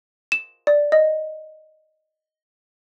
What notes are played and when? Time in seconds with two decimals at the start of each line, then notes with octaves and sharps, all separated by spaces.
0.32 E7
0.67 D5
0.92 D#5